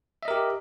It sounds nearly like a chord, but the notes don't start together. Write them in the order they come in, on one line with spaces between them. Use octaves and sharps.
E5 D#5 A#4 G4